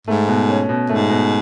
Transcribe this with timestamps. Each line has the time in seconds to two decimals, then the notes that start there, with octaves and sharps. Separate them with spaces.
0.07 G#2 A3
0.28 B2
0.49 C#4
0.69 B2
0.89 G#2 A3
1.10 B2